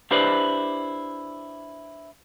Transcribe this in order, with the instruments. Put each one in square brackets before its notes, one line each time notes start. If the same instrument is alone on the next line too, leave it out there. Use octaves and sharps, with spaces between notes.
[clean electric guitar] D4 E4 G4 B4 C5 D5